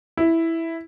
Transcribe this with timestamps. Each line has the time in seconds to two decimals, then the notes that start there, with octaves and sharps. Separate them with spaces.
0.17 E4